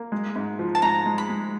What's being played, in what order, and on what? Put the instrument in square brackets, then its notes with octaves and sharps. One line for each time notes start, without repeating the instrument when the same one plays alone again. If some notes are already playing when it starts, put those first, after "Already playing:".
Already playing: [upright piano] A#3
G#3
G#2
F3
[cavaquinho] A5
[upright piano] G#2 [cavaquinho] A#5
[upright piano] G#3
[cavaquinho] B5
[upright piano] G#3